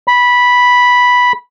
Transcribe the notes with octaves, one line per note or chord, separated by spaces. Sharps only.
B5